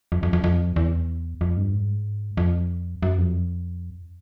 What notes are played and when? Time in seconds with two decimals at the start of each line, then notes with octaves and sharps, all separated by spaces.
0.12 F2
0.23 F2
0.33 F2
0.44 F2
0.76 E2
1.41 F2
1.57 G2
1.73 G#2
2.37 F2
3.03 F#2
3.18 F2